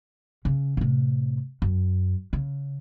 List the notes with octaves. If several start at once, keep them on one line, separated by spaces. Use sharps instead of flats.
C#3
A2 C3
F#2
C#3